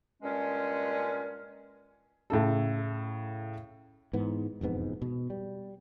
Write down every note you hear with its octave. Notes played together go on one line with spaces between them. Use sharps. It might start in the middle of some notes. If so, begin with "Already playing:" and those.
G2 A#2 G#3 C#4
A2 C#3 A4
G#2 E3 B3
E1 F2 G#2 B3
B2
G3